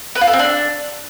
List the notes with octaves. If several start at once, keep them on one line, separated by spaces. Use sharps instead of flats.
B4
F4
A4
C4
D4